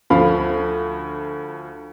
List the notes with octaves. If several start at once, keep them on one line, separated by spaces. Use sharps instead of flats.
D2 F3 F5 B5